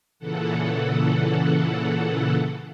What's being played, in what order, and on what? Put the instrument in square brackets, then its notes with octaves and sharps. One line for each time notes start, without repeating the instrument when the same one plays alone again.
[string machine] A#2 C#3 E3 A4 F#5